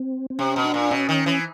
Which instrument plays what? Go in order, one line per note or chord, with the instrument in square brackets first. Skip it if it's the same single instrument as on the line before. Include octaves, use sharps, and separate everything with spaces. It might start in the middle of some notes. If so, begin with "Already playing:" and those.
Already playing: [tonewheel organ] C4
C4
[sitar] C3 [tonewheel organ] C#4
[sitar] B2
[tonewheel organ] D4
[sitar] A#2
[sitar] B2 [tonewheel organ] C#4
[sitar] D#3
E3